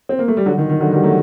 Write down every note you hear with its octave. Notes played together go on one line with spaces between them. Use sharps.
C4
A#3
A3
G3
D3 F#3
D#3
D#3
D3 F#3
D#3 G3
F#3 A3